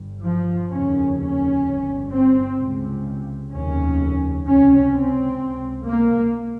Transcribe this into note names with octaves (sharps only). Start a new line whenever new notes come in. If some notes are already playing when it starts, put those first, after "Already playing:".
Already playing: G1 G2
F3
F1 D#2 C#3 C#4
C#4
G1 G2
C4
C#2 C3
F1 D#2 C#3 C#4
C#2 C3 C#4
C4
C#2 C3
A#3